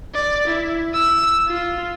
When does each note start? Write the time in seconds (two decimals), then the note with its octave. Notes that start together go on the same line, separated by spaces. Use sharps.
0.14 D5
0.47 E4
0.94 E6
1.47 F4